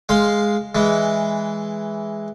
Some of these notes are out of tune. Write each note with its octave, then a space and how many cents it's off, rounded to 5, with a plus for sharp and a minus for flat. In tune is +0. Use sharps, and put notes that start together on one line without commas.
G#3 +0 F5 +0 C6 +0
E3 +0 G#3 +0